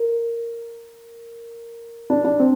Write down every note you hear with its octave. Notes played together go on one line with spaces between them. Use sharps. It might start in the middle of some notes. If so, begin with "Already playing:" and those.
Already playing: A#4
D4
D4
C4